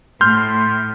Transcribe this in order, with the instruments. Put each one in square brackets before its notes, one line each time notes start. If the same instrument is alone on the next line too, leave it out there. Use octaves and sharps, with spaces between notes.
[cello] A2 [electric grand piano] C6 F6 G6